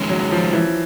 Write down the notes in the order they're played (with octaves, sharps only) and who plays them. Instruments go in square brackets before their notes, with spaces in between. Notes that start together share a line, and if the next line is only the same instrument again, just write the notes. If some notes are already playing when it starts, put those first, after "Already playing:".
Already playing: [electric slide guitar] D#3 G#3 C#4
[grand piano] F#3
F3
E3